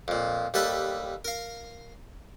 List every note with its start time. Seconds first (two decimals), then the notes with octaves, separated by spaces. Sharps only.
0.08 F2 A#2
0.54 D#2 G3 A4 B4 A5
1.25 A#4 F5